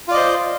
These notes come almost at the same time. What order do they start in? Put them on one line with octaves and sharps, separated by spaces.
F4 D5 D#5 C5